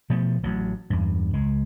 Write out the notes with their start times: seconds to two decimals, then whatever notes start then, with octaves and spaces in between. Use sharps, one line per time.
0.10 B2 F3 A3
0.43 A1 F#3
0.90 E2 G2
1.34 C#2 G#3